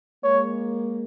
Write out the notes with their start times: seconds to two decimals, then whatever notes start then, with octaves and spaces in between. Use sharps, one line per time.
0.24 G#3 A#3 C#5